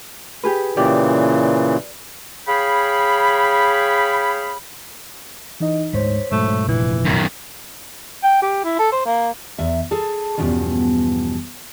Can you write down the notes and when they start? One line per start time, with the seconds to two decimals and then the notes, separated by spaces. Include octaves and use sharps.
0.44 G4 G#4 B4
0.77 A#2 C#3 E3 G4 D5 G5
2.48 G#4 C#5 F5 G5 B5
5.60 E3 D#4 D#5
5.93 D2 G#2 C5 C#5 B6
6.32 G#2 B2 F#3 A3
6.68 F1 G2 A#2 E3
7.06 F#2 D#3
8.24 G5
8.42 G4
8.64 E4
8.79 A4
8.92 C5
9.06 A#3
9.59 E2 E5
9.91 G#4 A4 A5
10.38 E2 G2 B2 F3 C#4